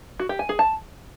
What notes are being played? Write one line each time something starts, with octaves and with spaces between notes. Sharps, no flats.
F#4
G4
G#5
G#4
A5